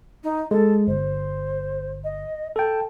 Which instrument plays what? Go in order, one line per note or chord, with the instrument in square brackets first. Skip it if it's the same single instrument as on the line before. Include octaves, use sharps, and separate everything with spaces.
[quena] D#4
[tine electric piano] G#3 [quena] A4
[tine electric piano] G1 [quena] C5
[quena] D#5
[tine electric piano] A4 G5 [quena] A5